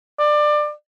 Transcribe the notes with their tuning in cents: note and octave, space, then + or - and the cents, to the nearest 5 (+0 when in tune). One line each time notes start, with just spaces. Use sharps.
D5 +25